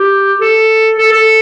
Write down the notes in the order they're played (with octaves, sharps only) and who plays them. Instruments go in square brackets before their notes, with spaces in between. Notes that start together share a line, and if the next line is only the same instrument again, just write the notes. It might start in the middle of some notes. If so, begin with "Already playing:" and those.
Already playing: [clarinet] G4
A4
A4
A4